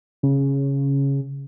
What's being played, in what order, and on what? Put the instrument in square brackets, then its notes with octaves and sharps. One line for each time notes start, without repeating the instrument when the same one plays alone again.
[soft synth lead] C#3